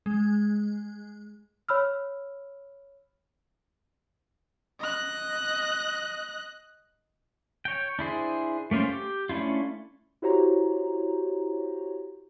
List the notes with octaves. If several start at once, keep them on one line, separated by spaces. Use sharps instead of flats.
G#3
C#5 B5 E6 F6
D#5 F#6
C#5 G5
D4 E4 G#4 C5
A3 A#3 C#4 F4 C5
G4
A3 C#4 D4 E4 F4
E4 F#4 G4 C5 C#5 A#5